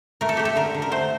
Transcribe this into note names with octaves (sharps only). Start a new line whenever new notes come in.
A3 A#4
A4
A3 G4
A4
D3 A#4
D3
A#4
A3 C5